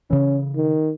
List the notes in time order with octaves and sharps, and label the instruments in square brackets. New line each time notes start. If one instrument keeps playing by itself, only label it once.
[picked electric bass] C#3 E3 [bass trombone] C#4
[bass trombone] D#3